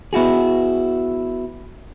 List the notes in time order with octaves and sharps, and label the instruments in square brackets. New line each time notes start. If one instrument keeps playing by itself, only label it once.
[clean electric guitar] B3 E4 F#4 G#4